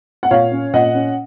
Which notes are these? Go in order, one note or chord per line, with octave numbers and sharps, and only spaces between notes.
F#5
A#2 C#5 F5
C#4
A#2 D#5 F#5
C#4